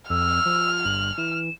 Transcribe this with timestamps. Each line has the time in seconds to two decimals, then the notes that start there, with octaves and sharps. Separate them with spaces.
0.10 F2 E6 F6
0.46 F3
0.85 G1 F#7
1.18 E3 E7